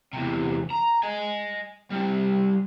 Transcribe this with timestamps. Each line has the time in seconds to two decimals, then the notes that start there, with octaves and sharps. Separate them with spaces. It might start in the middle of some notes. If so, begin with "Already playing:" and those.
0.13 E2 C3
0.70 A#5
1.03 D#5 G#5
1.91 G3 C4